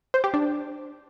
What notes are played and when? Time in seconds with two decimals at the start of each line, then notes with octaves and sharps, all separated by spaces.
0.14 C5
0.24 G4
0.34 D4